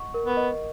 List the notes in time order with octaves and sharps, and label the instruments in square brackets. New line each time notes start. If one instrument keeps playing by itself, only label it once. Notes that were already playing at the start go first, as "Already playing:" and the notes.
Already playing: [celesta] D#5 F#5 C#6
A#4
[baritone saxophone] B3
[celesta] D#5